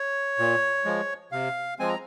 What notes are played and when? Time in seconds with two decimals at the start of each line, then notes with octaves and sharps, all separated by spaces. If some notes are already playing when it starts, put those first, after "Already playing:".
Already playing: C#5
0.39 A#2
0.85 F3 G#3
1.32 C3 F5
1.79 F3 G#3 C4 G#5
1.89 A#5